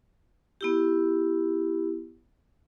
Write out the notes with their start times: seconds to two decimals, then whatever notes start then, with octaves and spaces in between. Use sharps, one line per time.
0.61 B3 E4 G4